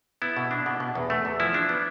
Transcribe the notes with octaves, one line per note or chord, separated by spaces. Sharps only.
B3 E4
B2
D4
B2
B2
E2
A3
E2
F3 E4
D4
B3